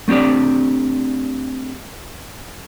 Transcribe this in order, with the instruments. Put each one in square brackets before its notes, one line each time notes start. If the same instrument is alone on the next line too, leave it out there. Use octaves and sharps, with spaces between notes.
[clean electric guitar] A3 C4 D4 G4 D5